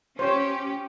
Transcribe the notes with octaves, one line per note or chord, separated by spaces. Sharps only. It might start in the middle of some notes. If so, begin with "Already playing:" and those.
C#4 G4 C5 C#5